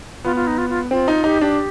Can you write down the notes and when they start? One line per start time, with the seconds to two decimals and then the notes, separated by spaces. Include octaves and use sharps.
0.25 B3 F4
0.36 F4
0.47 D#4
0.58 F4
0.70 F4
0.91 C4 F4
1.08 D#4
1.24 D#4 G4
1.41 D4 G4